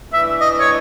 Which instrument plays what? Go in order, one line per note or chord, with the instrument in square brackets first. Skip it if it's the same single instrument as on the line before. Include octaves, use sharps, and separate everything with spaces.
[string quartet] A2 E3 A3 D4 [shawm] E5
[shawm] D#5
C#5